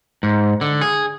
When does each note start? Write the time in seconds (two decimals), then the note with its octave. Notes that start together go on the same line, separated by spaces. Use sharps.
0.23 G#2
0.61 D3
0.81 G#4